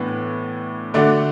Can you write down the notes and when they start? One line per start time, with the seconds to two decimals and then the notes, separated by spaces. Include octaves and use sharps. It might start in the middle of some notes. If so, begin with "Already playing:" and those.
Already playing: A2 E3 B3 D4
0.94 D3 A3 D4 F#4